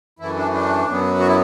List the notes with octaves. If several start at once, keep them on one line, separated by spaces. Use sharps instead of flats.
F#2 E3 A3 E4
D4
D4
F#2 F#3 B3
F#4
E4